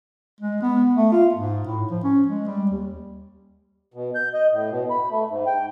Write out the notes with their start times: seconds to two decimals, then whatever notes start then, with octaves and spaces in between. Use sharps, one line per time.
0.41 G#3
0.62 B3
0.95 A3
1.12 F4
1.34 G#2
1.66 A2
1.91 F3
2.04 C#4
2.28 G#3
2.47 G3
2.71 D#2
3.94 B2
4.15 G6
4.34 D#5
4.52 A2
4.70 B2
4.90 B5
5.11 A3
5.30 G#2
5.46 G5